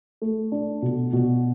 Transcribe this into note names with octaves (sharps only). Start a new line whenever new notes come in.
A3
D4
B2
B2